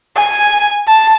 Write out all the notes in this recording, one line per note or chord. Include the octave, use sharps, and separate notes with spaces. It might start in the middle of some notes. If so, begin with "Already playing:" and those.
G#5
A5